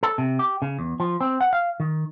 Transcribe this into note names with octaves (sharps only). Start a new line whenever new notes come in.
A4
C3
G4
C#3
E2
F3
C4
F#5
F5
D#3